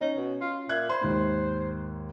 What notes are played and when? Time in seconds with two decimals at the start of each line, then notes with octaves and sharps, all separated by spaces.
0.01 C#4 D#4
0.17 B2
0.41 F4
0.69 A#2 E5 F#6 G#6
0.89 C5 B5 C6
1.01 D#2 G#2